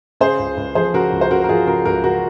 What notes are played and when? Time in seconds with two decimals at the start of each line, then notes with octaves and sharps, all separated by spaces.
0.20 C#3 G#4 C5
0.39 C#2
0.57 C#2
0.75 F3 G#4 C5
0.94 C#3 F#4 A#4
1.12 C#2
1.21 C5
1.31 C#2 F#4 A#4
1.44 A#4
1.49 F3 F4 G#4
1.67 C#3 F#4 A#4
1.85 C#2 F#4 A#4
2.04 C#2 F#4 A#4